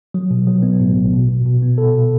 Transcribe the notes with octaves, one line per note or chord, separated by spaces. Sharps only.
F#3
B2
F#3
B3
A2
A1
B2
B2
B2
B3
A4
B2